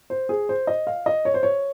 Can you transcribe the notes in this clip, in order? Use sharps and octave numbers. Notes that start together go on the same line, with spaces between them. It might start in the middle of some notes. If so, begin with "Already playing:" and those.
C5
G#4
C5
D#5
F5
D#5
C#5
C5
C#5